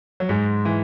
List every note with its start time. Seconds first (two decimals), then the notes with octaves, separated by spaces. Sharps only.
0.20 F#3
0.29 G#2 G#3
0.65 E3